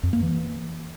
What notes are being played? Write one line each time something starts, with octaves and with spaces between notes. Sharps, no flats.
F2
A#3
E3